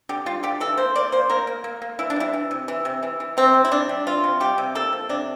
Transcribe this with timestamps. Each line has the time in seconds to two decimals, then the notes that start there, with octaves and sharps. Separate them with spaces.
0.09 D3 G4
0.26 G3 F4
0.43 D3 G4
0.60 E3 A4
0.77 A#3 C5
0.96 A#3 D5
1.12 A#3 C5
1.30 A#3 A#4
1.47 A#3
1.64 A#3
1.82 A#3
1.99 E3 E4
2.10 D4
2.16 G3 E4
2.33 E3
2.51 C3
2.68 E3
2.85 C3
3.03 E3
3.20 E3
3.37 C3 C4
3.55 C3
3.65 E4
3.72 C3 D4
3.89 G3
4.06 E3 F4
4.24 C3
4.40 G3 G4
4.58 C3
4.75 A#3 A4
4.93 F3
5.09 C3 D4